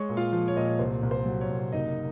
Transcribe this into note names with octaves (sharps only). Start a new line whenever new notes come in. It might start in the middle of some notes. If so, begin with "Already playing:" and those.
Already playing: G#3 C#5 C#6
A#2
F4 F5
F3
C#5
A#2 D#5
C#5
C2 C5
C2
C5
F#3
C#5
C2
F#1 D#4 D#5